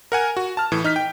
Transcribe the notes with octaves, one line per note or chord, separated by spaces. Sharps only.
A#4 F#5 G#5
F#4
A5 F6
A2 E3
D#4 F6 B6
G5